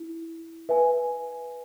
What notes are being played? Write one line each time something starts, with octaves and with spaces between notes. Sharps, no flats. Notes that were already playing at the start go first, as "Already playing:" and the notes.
Already playing: E4
B4 E5 G#5